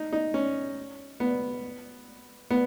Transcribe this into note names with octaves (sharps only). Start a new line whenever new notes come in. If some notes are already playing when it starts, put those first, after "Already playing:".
Already playing: D#4
D#4
C#4
B3
B3